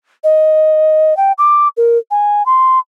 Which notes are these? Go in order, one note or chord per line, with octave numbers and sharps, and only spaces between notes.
D#5
G5
D6
A#4
G#5
C6